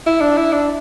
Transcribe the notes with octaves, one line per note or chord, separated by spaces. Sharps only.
E4
D4
E4
D4